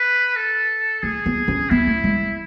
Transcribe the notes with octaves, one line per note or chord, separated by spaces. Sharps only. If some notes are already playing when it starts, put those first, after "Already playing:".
Already playing: B4
A4
A3 G#4
B3
C#4
B3 E4
A3
G#3